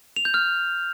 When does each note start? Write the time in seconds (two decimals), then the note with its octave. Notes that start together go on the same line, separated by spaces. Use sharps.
0.16 F7
0.25 G6
0.34 F6